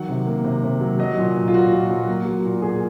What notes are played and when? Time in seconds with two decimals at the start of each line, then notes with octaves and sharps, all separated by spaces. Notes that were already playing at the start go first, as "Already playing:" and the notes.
Already playing: D#3 F#3 F#5
0.09 C3
0.27 A#3
0.44 C3
0.64 C3
0.81 F#3
0.99 F#3 D#5
1.18 A#2
1.35 F#3
1.48 F4
1.54 A#2 F#4
1.72 A#2
1.90 F#3
2.08 A#3
2.26 F#3
2.44 A#2
2.62 A#2 G#4